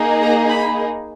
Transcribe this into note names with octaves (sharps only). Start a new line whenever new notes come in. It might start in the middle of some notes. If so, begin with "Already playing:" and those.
Already playing: A#3 D#4 G#4
A#5
B5